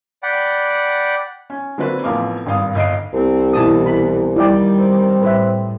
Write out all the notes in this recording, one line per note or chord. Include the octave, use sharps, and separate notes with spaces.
D5 F#5 G5 B5
C#4
D3 F#3 A#3 C4 F#4 B4
A1 F2 B3 A#4 F5 D6
G#1 G2 F5 D#6
G1 D#5 C7 D7
C2 C4
B2 E3 E4 A5 D#6
B5
D#3 G3 E4 D5 G5
C4
A2 B4 E5